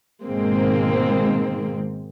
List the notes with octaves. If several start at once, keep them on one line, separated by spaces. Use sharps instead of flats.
G#2 B2 D#3 G#3 A#3 C4